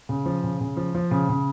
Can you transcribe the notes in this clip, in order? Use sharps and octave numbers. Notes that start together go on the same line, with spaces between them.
C#3
F3
C#3
C#3
F3
F3
C#3
C#3